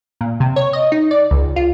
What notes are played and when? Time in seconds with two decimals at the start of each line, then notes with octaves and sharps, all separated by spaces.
0.21 A#2
0.40 C3
0.56 C#5
0.73 D#5
0.92 D#4
1.11 D5
1.31 C#2
1.56 F4